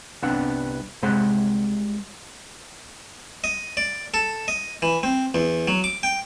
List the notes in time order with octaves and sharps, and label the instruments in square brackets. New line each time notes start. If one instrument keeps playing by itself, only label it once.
[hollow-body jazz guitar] C2 B3 C4 D4 F#5
C2 C3 G#3 C5 F#5 C6
[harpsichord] D#5
D5
A4
D#5
E3
C4
E2
F#3
D6
G5